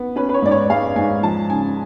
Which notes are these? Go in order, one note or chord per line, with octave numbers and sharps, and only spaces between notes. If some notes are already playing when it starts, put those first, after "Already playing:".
Already playing: B3
C#4 B4
B4
C#5
G#2 D5
C#5
G#3 F5
G#2 G#5
F3 A5
C#3 G#5